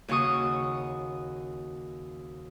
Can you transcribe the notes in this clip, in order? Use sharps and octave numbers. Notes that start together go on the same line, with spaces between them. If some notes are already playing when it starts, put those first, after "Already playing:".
D#2 C#3 F#4 C#6 D#6